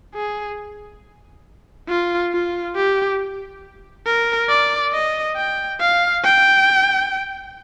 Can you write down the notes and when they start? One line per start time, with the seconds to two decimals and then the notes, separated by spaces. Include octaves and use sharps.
0.15 G#4
1.88 F4
2.32 F4
2.76 G4
4.06 A#4
4.49 D5
4.93 D#5
5.36 G5
5.80 F5
6.24 G5